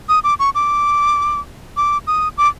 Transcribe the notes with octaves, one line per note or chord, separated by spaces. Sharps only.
D#6
D6
C#6
D6
D6
D#6
D6